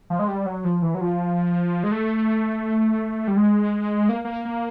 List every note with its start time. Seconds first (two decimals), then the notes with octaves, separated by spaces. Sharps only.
0.10 F3
0.19 G#3
0.28 G3
0.46 F#3
0.65 F3
0.82 E3
0.95 F#3
1.01 F3
1.83 G#3
1.92 A3
3.28 G3
3.37 G#3
4.09 A#3
4.25 A#3
4.45 A#3